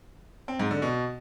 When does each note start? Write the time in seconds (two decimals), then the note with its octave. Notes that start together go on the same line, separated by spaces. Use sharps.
0.48 C4
0.59 G#2
0.71 D3
0.82 B2